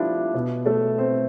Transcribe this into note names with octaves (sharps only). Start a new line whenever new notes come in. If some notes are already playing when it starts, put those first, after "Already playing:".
Already playing: F3 G3 A3 B3 D4 E4 F4 G4
B2 B3
A3 A4
C4 C5